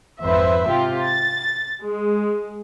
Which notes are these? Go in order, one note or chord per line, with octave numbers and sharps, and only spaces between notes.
G#1 F2 B4 C5 E5
C3 F4 G4
A6
G#3